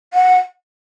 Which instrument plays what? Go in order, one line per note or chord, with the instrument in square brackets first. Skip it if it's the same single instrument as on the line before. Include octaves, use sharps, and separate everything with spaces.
[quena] F#5